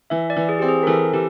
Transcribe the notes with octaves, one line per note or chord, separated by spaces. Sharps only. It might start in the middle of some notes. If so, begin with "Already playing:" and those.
E3 E5
D5
E3
G#4
C4 G4
G#4
A#4
E3 A4
E3 G4